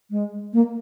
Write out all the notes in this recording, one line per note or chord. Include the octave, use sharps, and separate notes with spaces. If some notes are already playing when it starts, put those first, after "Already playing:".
G#3
A#3